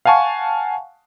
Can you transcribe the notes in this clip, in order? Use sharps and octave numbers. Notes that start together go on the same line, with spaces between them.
F5 F#5 G#5 A5 C#6